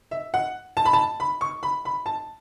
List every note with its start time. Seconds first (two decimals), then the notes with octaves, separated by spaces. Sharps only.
0.11 E5
0.34 F#5
0.77 A5
0.85 B5
0.93 A5
1.20 B5
1.41 C#6
1.63 B5
1.85 B5
2.06 A5